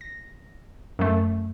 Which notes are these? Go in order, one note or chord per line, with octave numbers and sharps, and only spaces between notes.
A#6
F#2 F#3 A3